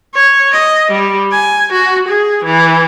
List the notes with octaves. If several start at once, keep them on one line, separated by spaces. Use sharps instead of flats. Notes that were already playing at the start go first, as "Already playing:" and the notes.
C#5
D#5
G3
G#5
F#4
G#4
E3